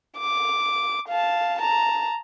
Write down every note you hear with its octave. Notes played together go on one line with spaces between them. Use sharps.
D6
F5 A5
A5 A#5